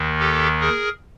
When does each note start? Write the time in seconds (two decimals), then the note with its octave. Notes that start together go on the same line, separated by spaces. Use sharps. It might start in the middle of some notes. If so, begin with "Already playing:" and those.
Already playing: D#2 D#3
0.20 G4 A4
0.61 G#4 A#4